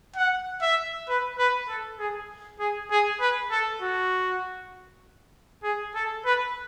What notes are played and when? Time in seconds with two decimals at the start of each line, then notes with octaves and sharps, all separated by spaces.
0.16 F#5
0.62 E5
1.09 B4
1.38 B4
1.68 A4
1.99 G#4
2.60 G#4
2.91 G#4
3.20 B4
3.51 A4
3.82 F#4
5.63 G#4
5.95 A4
6.25 B4